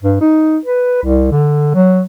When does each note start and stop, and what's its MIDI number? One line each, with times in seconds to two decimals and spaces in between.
0.03 0.17 43
0.21 0.58 63
0.65 0.99 71
1.03 1.28 36
1.31 1.71 50
1.74 2.02 54